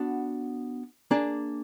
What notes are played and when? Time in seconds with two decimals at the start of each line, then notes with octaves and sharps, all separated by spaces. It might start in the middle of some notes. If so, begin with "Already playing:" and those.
Already playing: B3 D4 F#4
1.11 A#3 D4 G#4